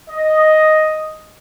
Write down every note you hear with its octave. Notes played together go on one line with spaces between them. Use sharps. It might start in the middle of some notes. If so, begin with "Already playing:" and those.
D#5